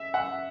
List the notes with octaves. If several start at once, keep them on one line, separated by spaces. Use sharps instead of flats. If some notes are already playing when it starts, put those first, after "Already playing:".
Already playing: E5
F#5